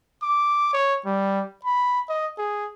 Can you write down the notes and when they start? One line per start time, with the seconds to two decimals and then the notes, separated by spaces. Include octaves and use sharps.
0.22 D6
0.73 C#5
1.06 G3
1.65 B5
2.09 D#5
2.38 G#4